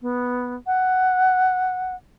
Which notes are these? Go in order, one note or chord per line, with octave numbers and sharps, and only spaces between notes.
B3
F#5